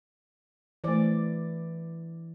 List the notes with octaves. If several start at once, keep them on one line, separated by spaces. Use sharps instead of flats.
E3 A3 C5 D5